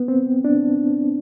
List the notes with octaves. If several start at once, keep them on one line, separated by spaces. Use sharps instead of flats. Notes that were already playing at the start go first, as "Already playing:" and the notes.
Already playing: B3
C4
D4